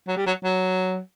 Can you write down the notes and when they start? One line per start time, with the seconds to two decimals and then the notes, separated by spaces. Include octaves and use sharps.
0.07 F#3
0.17 G3
0.26 F#3
0.44 F#3